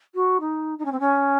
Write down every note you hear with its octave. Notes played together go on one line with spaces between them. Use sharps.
F#4
D#4
D#4
C#4
C4
C#4